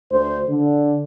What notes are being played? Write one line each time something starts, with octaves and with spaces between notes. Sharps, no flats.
D2 C5
D3